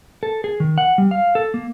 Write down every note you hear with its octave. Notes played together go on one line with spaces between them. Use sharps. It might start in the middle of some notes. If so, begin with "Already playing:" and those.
A4
G#4
D#3
F#5
G3
F5
A4
A#3